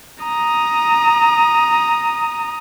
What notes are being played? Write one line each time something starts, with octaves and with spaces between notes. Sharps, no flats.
A#5 D#6